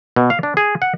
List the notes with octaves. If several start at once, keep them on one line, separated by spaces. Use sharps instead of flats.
B2
F5
D4
G#4
F#5